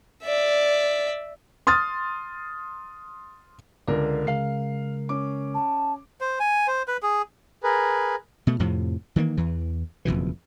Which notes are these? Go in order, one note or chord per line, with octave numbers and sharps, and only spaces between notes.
D5 E5
C6 D#6 F6 A6
C#2 D3 A#4 D5
C#3 G#3 A#4 F5 C7
C#4 D6
A5
C5
G#5
C5
B4
G#4
G#4 A#4 B4
B2 A3
F2 A2 C3 F3
D#3 E3 G3 A#3
E2 E3
F#1 F2 B2 E3